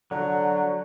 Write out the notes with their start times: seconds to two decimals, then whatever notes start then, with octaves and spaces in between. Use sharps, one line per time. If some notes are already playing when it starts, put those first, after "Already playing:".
0.11 D3 F#3